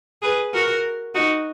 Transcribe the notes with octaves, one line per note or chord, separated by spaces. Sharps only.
G#4 B4
F#4 A#4
D#4 F#4